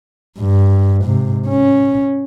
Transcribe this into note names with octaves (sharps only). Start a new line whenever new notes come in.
G2
G#2 C3
C#4